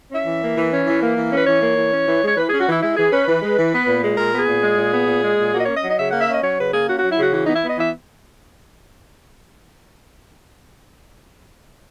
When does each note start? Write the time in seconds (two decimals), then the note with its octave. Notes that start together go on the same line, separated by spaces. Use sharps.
0.12 C#4 E5
0.26 E3
0.42 A#3
0.57 E3
0.71 C#4
0.86 E3
1.01 A#3
1.17 E3
1.31 C#4 B4
1.46 E3 C#5
1.62 A#3
1.77 E3
1.92 C#4
2.07 E3
2.22 G#3
2.27 C#5
2.36 E3 B4
2.48 C#4 G#4
2.60 F#4
2.67 E3 E4
2.82 G#3 E4
2.96 E3 G#4
3.12 C#4 B4
3.27 E3
3.42 G#3
3.57 E3
3.72 B3
3.87 A#2
4.02 G#3
4.17 A#2 A#4
4.32 B3
4.39 G#4
4.47 A#2
4.63 G#3
4.77 A#2
4.92 B3
5.07 A#2
5.22 G#3
5.38 A#2
5.52 A#3 F#4
5.59 D#5
5.64 C#4 C#5
5.75 D#5
5.82 F#3
5.89 D#5
5.98 C#3 E5
6.09 A#3 F#5
6.20 E5
6.28 C#4 D#5
6.42 F#3 C#5
6.58 C#3 B4
6.72 A#3 G#4
6.87 C#4 F#4
6.98 F#3 F#4
7.10 E4
7.17 C#3 F#4
7.33 E3 F#4
7.44 B3 D#4
7.55 E4
7.62 B3 D#5
7.78 E3 E5